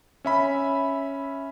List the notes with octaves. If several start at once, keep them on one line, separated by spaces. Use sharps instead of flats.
C#4 E5 B5